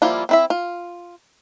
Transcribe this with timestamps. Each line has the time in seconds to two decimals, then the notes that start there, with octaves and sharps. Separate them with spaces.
0.02 F3 G3 A#3 E4 F4
0.29 C4 E4 E5
0.50 F4